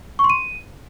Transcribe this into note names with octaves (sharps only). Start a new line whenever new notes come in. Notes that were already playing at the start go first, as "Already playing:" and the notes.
C#6
C6
D#7